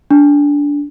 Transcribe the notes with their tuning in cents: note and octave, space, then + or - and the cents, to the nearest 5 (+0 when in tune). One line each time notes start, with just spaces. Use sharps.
D4 -20